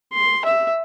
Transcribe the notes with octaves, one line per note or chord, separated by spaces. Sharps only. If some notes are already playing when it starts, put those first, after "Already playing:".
C6
E5